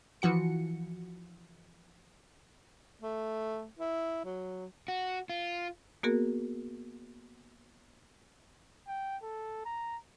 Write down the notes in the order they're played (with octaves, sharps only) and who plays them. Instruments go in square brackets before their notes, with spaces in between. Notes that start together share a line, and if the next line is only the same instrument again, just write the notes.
[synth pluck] E3 F3 F#4 C#7
[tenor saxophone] A3
E4
F#3
[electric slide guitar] F#4
F4
[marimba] A#3 B3 F#4 G#4 A#4
[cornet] G5
A4
A#5